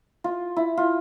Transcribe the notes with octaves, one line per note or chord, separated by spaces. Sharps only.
F4
E4
F4